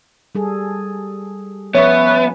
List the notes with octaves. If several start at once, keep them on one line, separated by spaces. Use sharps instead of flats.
G3 G#4 A4
F3 B3 C#4 B4 C#5 E5 C#6